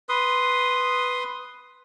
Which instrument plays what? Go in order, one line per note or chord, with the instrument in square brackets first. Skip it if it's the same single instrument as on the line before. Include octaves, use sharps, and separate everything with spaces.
[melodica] B4 C6 D#6